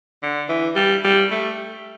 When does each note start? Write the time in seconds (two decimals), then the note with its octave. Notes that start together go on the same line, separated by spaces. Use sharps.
0.23 D3
0.49 E3
0.76 G3
1.04 G3
1.31 A3